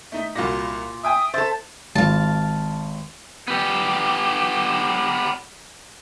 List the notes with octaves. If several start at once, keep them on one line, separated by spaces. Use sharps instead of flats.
A3 D#4 B6
C2 A#2 F4 F#4 A#6
E5 G5 G#5 D#6
A4 C5 E5 A6
G#1 F4 F5 A5
B3 G4